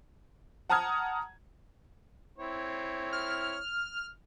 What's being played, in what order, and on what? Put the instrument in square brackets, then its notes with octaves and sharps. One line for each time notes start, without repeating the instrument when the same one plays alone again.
[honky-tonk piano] F#5 A5 A#5 D#6 F6 G#6
[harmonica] C4 E4 C#5
[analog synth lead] F6